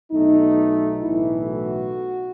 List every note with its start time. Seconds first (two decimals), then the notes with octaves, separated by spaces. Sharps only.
0.12 B1 B2 A3 D#4
1.02 B1 A2 E3 A3 E4
1.47 F#4